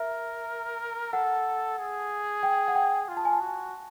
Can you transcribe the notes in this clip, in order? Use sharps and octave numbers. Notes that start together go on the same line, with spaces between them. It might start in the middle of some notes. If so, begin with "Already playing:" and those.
Already playing: A#4 E5
A4 F#5
G#4
G5
F#5
G5
F4
A5
G#5
A5
F#4